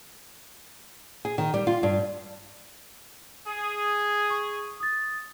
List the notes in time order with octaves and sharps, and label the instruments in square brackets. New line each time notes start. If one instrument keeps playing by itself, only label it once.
[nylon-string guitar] G#4
D#3
G3
F4
G2
[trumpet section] G#4
[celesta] C#6
D#6 A6